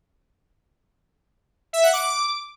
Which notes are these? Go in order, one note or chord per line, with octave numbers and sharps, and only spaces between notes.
E5
F#5
D6